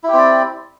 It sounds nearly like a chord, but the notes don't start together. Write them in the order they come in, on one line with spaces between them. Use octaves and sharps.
E4 G4 C4 D5